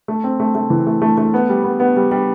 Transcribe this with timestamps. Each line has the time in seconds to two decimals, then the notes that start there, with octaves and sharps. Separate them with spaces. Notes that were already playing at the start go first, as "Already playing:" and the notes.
0.08 A3
0.24 C4
0.40 A3
0.55 A3
0.70 E3
0.87 A3
1.02 A3
1.18 A3
1.34 B3
1.49 G3
1.64 B3
1.80 B3
1.97 G3
2.11 G3